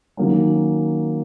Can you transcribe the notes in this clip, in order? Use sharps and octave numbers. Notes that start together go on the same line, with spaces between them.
D#3 F#3 A#3 C#4